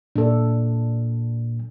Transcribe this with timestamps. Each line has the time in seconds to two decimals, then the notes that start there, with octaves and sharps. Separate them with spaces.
0.16 A#2 D4 A4